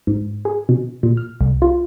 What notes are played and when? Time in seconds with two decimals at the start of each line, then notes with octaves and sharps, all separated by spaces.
0.07 G#2
0.45 G#4
0.69 B2
1.03 A#2
1.17 F6
1.41 C2
1.62 F4